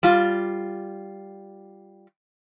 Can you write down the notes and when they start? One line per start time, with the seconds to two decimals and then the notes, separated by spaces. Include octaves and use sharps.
0.03 G3 F4